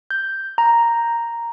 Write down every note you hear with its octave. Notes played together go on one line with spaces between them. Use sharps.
G6
A#5